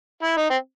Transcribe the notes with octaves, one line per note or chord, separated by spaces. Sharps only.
E4
D#4
C4